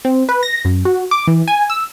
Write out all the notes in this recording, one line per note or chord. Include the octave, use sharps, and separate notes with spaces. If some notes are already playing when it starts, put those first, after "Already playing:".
C4
B4
A#6
F#2
F#4
D6
E3
G#5
E6